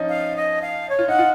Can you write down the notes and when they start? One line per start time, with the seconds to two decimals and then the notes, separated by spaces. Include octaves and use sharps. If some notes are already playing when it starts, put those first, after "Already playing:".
Already playing: F3 C#4 D#4
0.09 F5
0.36 D#5
0.62 F5
0.89 C#5
0.99 F4
1.08 D#4 F#5
1.19 F4